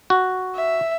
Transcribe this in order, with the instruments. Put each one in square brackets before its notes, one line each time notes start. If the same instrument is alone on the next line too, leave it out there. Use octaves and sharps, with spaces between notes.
[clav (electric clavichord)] F#4
[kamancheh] E5